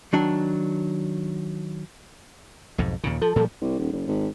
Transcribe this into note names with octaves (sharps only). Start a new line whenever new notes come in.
D#3 F#3 D4
B1 F2 G#2
D#2 A#2 C#3
F3 A4
A#2 F3 G3
C2
D#1
F#1
G#1